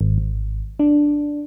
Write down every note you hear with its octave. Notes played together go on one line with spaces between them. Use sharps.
G#1
G#1
D4